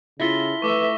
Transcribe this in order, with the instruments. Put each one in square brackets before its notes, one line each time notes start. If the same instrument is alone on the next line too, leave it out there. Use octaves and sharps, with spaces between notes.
[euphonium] C#3 [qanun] E4 F4 A4 [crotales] A#6 B6 G7
[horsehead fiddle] A3 E5 [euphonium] B4 [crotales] C#6 D6 G7